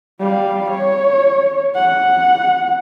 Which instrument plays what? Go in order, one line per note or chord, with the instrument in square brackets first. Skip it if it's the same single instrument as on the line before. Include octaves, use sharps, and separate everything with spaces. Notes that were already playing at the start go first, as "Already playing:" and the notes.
[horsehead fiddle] G3 F5
C#5
F#5